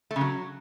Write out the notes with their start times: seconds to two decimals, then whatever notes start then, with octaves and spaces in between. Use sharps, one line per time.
0.11 A3
0.16 C#3
0.21 F#3